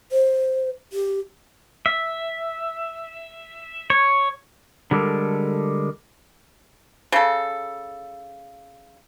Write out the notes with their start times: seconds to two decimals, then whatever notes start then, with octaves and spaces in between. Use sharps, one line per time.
0.12 C5
0.93 G4
1.86 E5
3.90 C#5
4.91 D3 G3 G#3 A#3 A4 A#4
7.12 C#3 A4